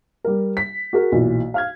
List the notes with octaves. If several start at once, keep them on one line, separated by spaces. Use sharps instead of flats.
G3 A#4
B6
F#4 G#4 A#4
B1 A#2 E3
F5 F6 G#6